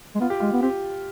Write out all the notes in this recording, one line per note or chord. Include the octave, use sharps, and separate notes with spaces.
G#3
B3 F4
G4
G#3 F4
B3
C4 G4